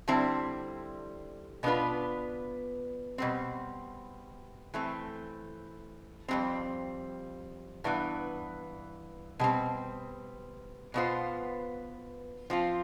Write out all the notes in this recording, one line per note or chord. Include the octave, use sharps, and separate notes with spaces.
D3 G3 C4 E4
B2 B3 D4 F4 B4
B2 G3 C4
E3 A3 C4
F2 C3 G3 C4
G2 E3 B3
B2 G3 C4
B2 B3 F4 C5
F3 C4 F4